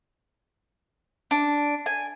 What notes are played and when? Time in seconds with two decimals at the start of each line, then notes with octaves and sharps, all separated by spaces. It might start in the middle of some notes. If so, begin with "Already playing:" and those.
1.31 D4
1.86 G#5